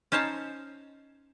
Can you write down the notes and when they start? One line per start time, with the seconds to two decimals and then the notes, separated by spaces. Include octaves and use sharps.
0.12 C#4 D#4 C5 C#5 A5